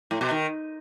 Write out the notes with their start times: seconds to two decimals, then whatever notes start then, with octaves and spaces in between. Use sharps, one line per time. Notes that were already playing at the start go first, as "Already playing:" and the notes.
0.11 A2
0.21 B2
0.31 D#3